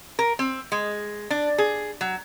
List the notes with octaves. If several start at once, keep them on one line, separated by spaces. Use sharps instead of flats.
A#4
C4
G#3
D4
G#4
F#3